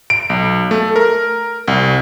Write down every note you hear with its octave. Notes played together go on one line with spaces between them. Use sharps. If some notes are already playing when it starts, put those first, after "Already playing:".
D7
B1
A3
A#4
C2